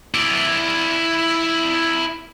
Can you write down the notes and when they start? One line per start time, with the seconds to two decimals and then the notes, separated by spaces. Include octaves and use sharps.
0.14 E4 D5